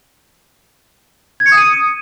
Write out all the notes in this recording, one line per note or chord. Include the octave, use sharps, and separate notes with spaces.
G#6
C#7
D#6
D#7